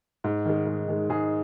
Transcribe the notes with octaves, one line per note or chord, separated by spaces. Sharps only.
G#2
D#3 G#3
G#2
D#3 G#3
G#2 G#4